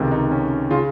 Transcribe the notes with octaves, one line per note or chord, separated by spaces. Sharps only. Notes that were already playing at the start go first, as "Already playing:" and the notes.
Already playing: C#2 C3 D#3
D#4
C#4
C#3 F4